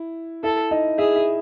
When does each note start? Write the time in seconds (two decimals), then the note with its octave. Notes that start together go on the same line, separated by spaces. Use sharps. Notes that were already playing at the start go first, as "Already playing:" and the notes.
Already playing: E4
0.43 E4 A4 E5
0.71 D#4 D#5
0.98 E4 G#4 E5
1.16 E4 E5